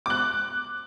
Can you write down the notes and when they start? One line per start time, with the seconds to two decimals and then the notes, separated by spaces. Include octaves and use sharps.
0.06 D6 F#6